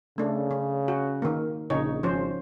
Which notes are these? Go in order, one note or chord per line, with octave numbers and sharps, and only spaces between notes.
C#3 A3 D4
C#4
F#4
D#3 A#3
A#1 C#3 D#4 C#5
G#1 F3 C#4 C5